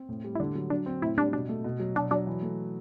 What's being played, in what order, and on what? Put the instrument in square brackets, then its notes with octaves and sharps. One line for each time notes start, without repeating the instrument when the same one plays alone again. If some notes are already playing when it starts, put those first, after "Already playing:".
Already playing: [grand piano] C4
A2
G3
[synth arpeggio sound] E4
[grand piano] D3 [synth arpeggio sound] D4
[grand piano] F#3
[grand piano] F#3 [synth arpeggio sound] D4
[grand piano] C4
[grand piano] A2 [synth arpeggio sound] E4
[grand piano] G3 [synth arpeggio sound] D4
[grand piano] B2 [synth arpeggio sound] D4
[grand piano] A3
B2
F#3
[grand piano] B2 [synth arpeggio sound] D4
[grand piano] F#3 [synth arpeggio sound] D4
[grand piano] E3
A3